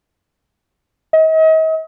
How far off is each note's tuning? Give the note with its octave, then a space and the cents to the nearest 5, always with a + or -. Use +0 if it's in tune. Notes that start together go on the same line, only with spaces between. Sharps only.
D#5 +40